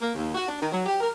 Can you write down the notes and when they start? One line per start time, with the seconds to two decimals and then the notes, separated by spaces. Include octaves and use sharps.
0.02 A#3
0.15 D#2
0.34 F#4
0.47 D4
0.60 D#3
0.72 F#3
0.86 G4
1.00 A#4